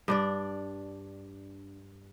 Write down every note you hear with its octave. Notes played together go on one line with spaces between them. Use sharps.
G2 D4 D5